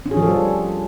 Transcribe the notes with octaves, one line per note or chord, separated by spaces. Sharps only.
C#4
G#4
F3
A4
G3